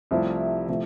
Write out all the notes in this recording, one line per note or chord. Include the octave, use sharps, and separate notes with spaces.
C2 C3 F3 A3 E4
C3 F3 A3 E4